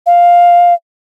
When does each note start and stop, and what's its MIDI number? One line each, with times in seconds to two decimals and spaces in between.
0.06 0.74 77